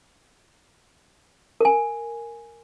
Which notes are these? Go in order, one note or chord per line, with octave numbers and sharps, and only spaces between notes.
A#4 G#5